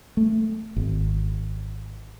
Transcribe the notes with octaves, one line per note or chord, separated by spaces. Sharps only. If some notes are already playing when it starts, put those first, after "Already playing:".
A3
G#1